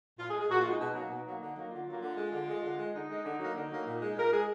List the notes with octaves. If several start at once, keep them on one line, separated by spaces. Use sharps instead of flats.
A#2 F4
G#4
G#3
G#4
A#2 F#4
F4
G#3
D#4
B2 D#4
F#3 A#3
B2
F#3 A#3
D3
F#3 A#3
D3 F4
F#3 A#3
D3
G#3
D3
G#3
D3
G#3
D3 D#4
G#3
D3
F#3 A#3
D3 D#4
F#3 A#3
A#2
G#3
A#2 A#4
G#3 G#4